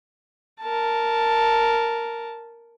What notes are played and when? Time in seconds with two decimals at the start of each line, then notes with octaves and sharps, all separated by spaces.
0.61 A#4 A5